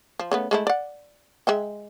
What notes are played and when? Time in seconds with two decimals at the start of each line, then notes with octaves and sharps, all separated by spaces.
0.19 F3
0.32 C#3 A3 B3
0.51 G#3 A3 E4
0.67 D5 F#5
1.47 G#3 E5 G5